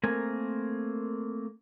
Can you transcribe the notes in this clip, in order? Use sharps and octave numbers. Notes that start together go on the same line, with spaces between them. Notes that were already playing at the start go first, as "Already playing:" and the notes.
A3 A#3 C4 A#4 G#5